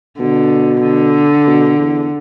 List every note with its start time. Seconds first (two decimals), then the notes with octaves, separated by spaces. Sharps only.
0.19 B2 D3
0.83 D3
1.47 B2
1.79 E2